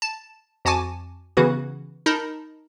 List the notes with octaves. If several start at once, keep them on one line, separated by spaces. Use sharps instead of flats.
A5
F2 F#4 G#5 A5 D6
C#3 E3 B3 F#4 B4
D#4 A#4 A5 B5